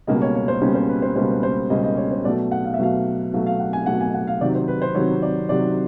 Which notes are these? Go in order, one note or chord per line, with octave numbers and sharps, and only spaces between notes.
C#2 B2 G3 A#3 C#4 D#5
C#5
C#5
C5
C#2 B2 G3 A#3 C#4 C#5
C5
B4
C5
C#2 B2 G3 A#3 C#4 C5
B4
C5
C#2 B2 G3 A#3 C#4 D#5
D#5
C#5
C5
B2 F#3 A3 D5
F#5
F5
E5
B2 F#3 A3 F5
B2 F#3 A3 F5
F5
F#5
G#5
B2 F#3 A3 F#5
G#5
F#5
F5
C3 D#3 F#3 D5
C5
B4
C5
C3 D#3 F#3 C#5
D5
C3 D#3 F#3 D5